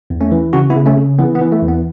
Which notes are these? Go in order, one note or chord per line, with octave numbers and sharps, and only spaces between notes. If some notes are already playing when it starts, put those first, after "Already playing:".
E2
A3 C#4
E3
C#3 C#4 F#4
B3 E4
C#3
A3 C#4
C#3
E3 B3
B3
E3
A3
E2
B3